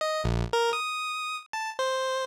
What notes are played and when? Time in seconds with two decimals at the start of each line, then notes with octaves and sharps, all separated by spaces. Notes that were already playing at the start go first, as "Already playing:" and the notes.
0.01 D#5
0.24 A#1
0.53 A#4
0.73 D#6
1.53 A5
1.79 C5